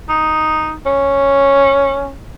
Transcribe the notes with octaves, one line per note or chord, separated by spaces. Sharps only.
D#4
C#4